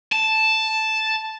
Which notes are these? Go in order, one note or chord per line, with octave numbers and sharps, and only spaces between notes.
A5